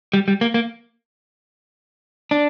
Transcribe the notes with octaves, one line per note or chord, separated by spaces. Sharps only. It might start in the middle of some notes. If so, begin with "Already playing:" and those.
G3
G3
A#3
A#3
D4